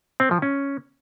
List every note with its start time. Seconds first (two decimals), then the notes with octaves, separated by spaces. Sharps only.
0.20 C4
0.31 F3
0.42 C#4